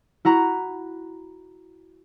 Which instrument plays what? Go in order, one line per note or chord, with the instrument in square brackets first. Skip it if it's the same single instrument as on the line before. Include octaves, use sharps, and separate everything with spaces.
[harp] E4 F#4 A#5